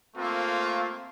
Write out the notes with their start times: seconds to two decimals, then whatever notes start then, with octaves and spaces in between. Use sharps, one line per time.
0.17 A3 A#3 C4 F4